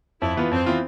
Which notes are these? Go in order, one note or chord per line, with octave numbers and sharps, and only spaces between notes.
F2 E4
E3 B3 F4
F2 C4
E3 B3 F4